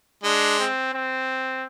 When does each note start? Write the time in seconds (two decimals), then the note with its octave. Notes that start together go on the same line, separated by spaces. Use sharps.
0.24 G#3 D4
0.59 C4
0.94 C4